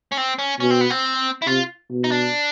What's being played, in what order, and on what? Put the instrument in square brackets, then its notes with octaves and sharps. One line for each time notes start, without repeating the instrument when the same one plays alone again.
[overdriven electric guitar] C#4
C4
C#4
[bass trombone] B2 [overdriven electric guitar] C#4
[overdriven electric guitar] C4
B3
C4
E4
[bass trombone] C3 [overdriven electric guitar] F4
[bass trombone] B2
[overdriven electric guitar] D#4
D4